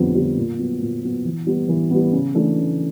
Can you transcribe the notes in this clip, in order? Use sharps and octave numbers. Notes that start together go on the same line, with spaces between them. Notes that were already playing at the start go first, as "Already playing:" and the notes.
Already playing: F2 D3 G3 B3
D3 G3 B3
A#2
F#3 B3
A#2
F#3 B3
E3
G3 B3
E3
G3 B3
C#3
E3 A3 D4
C#3